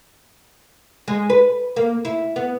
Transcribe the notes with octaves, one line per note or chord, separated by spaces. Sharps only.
G#3
B4
A#3
E4
B3